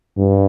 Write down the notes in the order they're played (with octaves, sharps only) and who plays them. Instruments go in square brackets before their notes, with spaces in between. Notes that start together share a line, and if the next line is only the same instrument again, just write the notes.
[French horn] G2